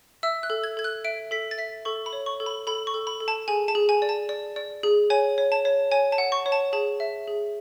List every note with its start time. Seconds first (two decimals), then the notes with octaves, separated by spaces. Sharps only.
0.23 E5 E6
0.43 F#6
0.50 A4
0.64 G#6
0.77 A4 G#6
0.84 F#6
1.04 E5 D7
1.31 A4 B6
1.51 A6
1.58 E5 B6
1.85 A4 C#6
2.06 B5
2.13 C#5
2.26 C#6
2.40 A4
2.46 B5
2.67 A4 B5
2.87 C#6
2.94 A4
3.07 B5
3.20 A4
3.28 A5
3.48 G#4 G#5
3.68 A5
3.75 G#4
3.89 G#5
4.02 D5
4.09 A5
4.29 D5
4.56 D5
4.83 G#4
5.10 C#5 G#5
5.38 C#5
5.52 A5
5.65 C#5
5.92 C#5 G#5
6.12 A5
6.18 F#5
6.32 C#6
6.46 C#5
6.52 A5
6.73 G#4 A5
7.00 E5
7.27 G#4